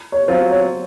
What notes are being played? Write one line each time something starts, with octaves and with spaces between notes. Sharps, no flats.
C#5
F#3 C4 F4 C5
C#5